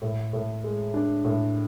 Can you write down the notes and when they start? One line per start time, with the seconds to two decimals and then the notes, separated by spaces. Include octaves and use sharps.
0.02 A2
0.33 A2
0.64 G#3
0.94 D4
1.25 A2